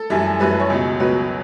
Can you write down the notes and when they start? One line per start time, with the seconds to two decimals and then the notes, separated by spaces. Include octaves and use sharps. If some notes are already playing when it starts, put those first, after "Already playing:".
Already playing: A4
0.10 F#2 E3 G3
0.39 F#2 E3 G3 B4
0.51 B4
0.60 C#5
0.70 C#2 B2 F#3
0.99 C#2 B2 F#3 B4